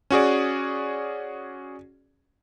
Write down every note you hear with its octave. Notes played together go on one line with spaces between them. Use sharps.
C#4 F#4 G#4 D5